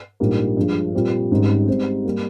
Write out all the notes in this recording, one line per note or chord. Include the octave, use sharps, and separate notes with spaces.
A#1 G#2 G3 A#3
G2 F3 G#3
A#2 G3 C4
G#1 G#2 G3 C#4
G#2 G3 C4 G4
G3 A#3